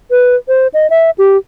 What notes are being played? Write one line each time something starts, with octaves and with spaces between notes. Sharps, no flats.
B4
C5
D#5
E5
G4